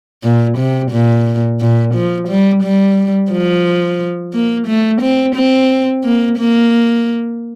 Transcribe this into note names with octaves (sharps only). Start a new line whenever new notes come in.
A#2
C3
A#2
A#2
F3
G3
G3
F3
A#3
A3
C4
C4
A#3
A#3